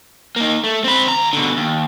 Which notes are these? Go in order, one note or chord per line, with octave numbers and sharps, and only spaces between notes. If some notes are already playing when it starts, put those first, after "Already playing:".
A#3 D#4
A3
C4 B5
D2 A#5
B2 D3
D#2